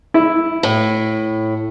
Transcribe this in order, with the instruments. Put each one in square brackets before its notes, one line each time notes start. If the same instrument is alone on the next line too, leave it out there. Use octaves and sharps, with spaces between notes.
[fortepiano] E4
[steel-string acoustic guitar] A2